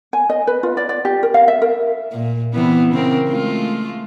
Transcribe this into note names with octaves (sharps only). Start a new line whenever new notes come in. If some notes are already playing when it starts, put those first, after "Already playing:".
G#5
D#5
B4
F4
D5
D5
G4
A#4
F5
E5
A#4
A#2
C3 E3 B3
C#3 C4 A#4
G#3 A3 F4